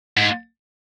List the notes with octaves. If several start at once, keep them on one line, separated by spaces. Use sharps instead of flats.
G#2